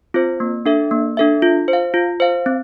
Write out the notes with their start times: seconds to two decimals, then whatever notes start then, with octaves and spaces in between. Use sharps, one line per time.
0.14 C4 F4 C5
0.40 A#3
0.66 D4 A4 E5
0.91 A#3
1.17 D4 A4 E5
1.42 F4
1.68 C5
1.73 F5
1.94 F4
2.20 C5 F5
2.46 C4